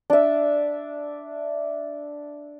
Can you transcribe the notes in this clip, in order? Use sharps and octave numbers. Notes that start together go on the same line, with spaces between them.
D4 E5